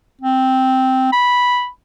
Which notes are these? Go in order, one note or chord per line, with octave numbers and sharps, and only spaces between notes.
C4
B5